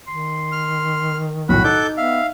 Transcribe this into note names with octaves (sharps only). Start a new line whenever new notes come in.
D#3 C6
F6
B1 A2 F#4 F#5 B5
D#4 A4 D6 G6
B3 E5 F5